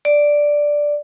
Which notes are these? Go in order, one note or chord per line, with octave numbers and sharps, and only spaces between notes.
D5